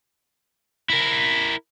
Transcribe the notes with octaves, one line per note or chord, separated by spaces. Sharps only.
E4 A#4